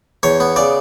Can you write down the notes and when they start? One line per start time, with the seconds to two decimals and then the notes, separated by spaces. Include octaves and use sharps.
0.23 E2 C#5
0.40 B3
0.56 C#3 D5